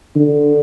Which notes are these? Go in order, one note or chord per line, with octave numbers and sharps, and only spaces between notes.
D3